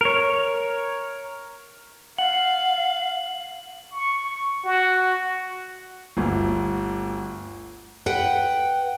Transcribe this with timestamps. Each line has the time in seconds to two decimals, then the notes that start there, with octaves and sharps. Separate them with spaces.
0.01 A#4 C#5
2.18 F5 F#5 F#7
3.92 C#6
4.65 F#4
6.17 G1 D2
8.06 B4 F#5 G5